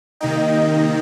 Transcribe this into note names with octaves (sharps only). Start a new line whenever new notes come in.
C3 D#3 A#3 D#4 D#5 G5